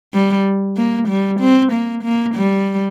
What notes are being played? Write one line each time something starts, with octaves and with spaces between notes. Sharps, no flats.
G3
A#3
G3
C4
A#3
A#3
G3